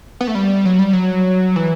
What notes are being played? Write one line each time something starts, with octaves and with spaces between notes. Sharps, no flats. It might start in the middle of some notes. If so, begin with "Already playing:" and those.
B3
A3
G3
F#3
G3
F#3
E3